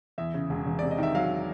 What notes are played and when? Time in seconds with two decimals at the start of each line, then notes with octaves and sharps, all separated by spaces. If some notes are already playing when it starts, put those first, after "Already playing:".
0.18 E2 E5
0.34 C#3
0.50 E1
0.67 E1
0.79 C3 D5
0.91 D#5
0.98 D#3 E5
1.15 F#3 F5